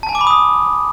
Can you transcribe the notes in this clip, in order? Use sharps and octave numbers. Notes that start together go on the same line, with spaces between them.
A5
G#5
D6
B5
D#6